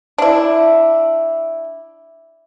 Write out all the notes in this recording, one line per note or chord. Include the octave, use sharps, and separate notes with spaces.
D4 E4